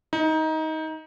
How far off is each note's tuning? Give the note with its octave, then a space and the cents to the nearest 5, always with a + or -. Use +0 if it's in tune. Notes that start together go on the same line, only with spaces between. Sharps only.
D#4 +20